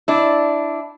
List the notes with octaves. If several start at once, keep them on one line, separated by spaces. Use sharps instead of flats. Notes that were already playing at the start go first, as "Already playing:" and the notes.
D4 E4